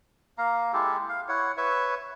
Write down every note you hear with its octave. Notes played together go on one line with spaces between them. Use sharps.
A#3 F5 A#5
G#3 E4 G4 A4
F5
E4 C#5 F#5
B4 C#5 E5